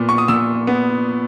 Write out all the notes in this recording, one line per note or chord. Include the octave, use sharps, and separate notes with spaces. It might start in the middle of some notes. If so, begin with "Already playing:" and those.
Already playing: A#2 B3
C#6
D#6
A#2 E6
B3